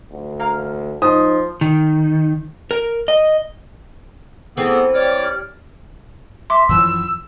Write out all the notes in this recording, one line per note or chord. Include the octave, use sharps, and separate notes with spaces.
D2
A#3 A#4 F5
F3 D#4 D#6
D#3
A#4
D#5
E3 B3 C4 G#4 A4
G4 C#5 D5 F6
E5 C6 D6
F#2 E3 F3 E6